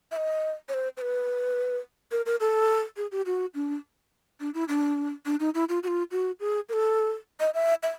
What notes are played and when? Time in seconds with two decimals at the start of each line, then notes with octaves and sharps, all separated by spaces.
0.12 E5
0.16 D#5
0.69 C#5
0.74 C5
0.97 C5
1.01 B4
2.12 A#4
2.26 A#4
2.40 A4
2.97 G#4
3.12 G4
3.26 F#4
3.55 D4
4.40 D4
4.54 E4
4.68 D4
5.26 D4
5.40 D#4
5.55 E4
5.69 F4
5.83 F#4
5.88 F4
6.11 F#4
6.40 G#4
6.69 A#4
6.73 A4
7.40 D#5
7.54 E5
7.83 E5